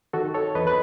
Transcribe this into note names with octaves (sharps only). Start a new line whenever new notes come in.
D#3 F#4 A4
A4 C#5
E2 B4 D#5
B4